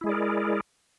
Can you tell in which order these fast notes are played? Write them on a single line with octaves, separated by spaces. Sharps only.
E4 G#3 G#4 D5 A#4